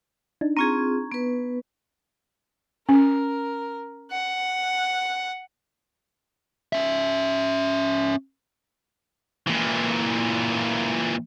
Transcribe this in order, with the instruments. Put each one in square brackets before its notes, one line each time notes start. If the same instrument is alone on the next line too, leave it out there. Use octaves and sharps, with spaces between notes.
[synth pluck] D4 D#4
[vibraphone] C4 F4 G#4 [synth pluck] A#5 C#6 G#6
[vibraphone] B3 B4
[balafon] C#4 [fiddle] A#4
[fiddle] F#5
[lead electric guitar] C#4 E5
[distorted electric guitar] A#2 E3